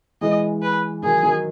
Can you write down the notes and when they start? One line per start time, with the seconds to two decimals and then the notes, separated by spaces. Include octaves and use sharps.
0.21 E3 G#3 D#5
0.62 B4
1.03 D#3 F#3 G#4
1.23 D#3 F#3